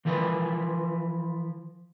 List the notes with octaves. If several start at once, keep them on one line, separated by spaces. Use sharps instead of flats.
E3 F3 A#4 B4